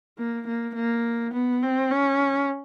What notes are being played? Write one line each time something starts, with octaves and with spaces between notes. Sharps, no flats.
A#3
A#3
A#3
B3
C4
C#4